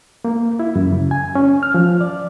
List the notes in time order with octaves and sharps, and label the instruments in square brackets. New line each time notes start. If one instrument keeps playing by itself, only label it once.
[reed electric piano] A#3
E4
F#2
C#3
G#5
C#4
F6
F3
D5